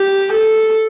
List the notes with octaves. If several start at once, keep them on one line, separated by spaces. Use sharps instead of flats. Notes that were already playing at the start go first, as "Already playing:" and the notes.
Already playing: G4
A4